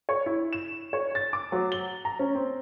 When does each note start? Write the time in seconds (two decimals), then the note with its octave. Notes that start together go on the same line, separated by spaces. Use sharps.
0.09 C#5
0.26 E4
0.53 E7
0.93 C#5
1.15 A6
1.33 D6
1.52 F#3
1.72 G7
2.05 A#5
2.19 C#4
2.35 C4